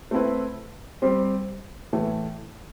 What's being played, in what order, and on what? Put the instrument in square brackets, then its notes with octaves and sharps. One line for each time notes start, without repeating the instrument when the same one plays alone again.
[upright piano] A3 C4 E4 B4
G3 C4 G4 C5
A2 E3 A3